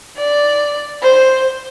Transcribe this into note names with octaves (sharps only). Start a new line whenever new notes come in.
D5
C5